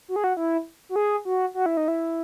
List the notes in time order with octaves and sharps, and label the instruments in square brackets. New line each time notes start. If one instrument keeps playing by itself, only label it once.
[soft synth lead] F#4
G#4
F#4
E4
F#4
G#4
F#4
F#4
E4
D#4
E4